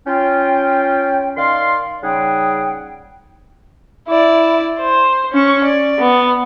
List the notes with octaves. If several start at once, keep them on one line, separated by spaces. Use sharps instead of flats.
C#4 F4 G5
D#3 D5 F5 C6
C#3 G3 D#4 G#4 F#5 G5
E4 D5
C5
C#4 C#6
D5
B3